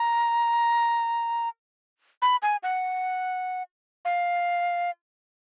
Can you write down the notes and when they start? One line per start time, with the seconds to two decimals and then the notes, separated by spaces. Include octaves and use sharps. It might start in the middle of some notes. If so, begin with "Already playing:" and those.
Already playing: A#5
2.22 B5
2.42 G#5
2.63 F#5
4.05 F5